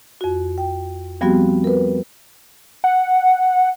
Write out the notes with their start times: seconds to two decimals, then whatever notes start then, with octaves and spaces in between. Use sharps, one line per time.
0.21 F2 F#4
0.58 G5
1.21 F3 G3 B3 C4 F#4 G4
1.64 A#4 B4
2.84 F#5